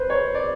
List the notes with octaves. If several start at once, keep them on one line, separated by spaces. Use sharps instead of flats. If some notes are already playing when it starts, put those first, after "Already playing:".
Already playing: B4 C5
C#5
D5